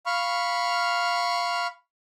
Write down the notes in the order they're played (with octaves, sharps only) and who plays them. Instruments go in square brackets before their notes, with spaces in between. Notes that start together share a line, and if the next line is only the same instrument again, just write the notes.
[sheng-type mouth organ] F5 B5 C#6 F6